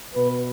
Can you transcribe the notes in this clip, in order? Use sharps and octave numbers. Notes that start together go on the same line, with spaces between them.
B2 B4